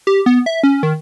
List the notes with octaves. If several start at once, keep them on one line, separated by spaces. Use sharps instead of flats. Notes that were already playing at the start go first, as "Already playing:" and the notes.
G4
B3
E5
C#4
D#3